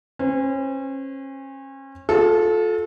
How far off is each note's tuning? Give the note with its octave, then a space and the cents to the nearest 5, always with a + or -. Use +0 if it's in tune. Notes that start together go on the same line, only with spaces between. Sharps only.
C#4 -35 C5 -35
F4 +35 A4 -15